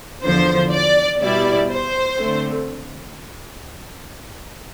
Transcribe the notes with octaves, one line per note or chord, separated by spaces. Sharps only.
E2 D3 F3 C5
D5
B2 G3 B3 E4 D5
C5
D3 A3 C4